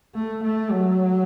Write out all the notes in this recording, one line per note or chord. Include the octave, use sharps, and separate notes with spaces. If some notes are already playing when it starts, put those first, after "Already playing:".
A3
A3
F#3